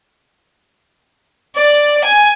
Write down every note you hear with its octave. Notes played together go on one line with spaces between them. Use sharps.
D5
G#5